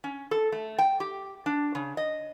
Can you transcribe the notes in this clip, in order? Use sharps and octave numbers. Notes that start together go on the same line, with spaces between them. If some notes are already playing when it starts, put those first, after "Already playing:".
C#4
A4
A3
G5
G4
D4
C#3
D#5